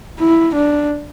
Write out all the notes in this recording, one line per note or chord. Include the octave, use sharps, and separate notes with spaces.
E4
D4